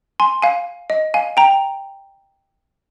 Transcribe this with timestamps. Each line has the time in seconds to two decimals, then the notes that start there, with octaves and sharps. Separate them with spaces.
0.20 G#5 C6
0.42 F5 G#5
0.90 D#5
1.14 F5 G#5
1.37 G5 A#5